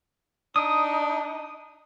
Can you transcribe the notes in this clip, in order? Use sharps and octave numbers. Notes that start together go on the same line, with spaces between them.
D4 D#4 D#6